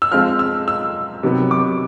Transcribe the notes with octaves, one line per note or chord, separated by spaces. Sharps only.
E6
F3 G#3 C4 F4 F6
E6
E6
C3 D#3 F#3 B3
D6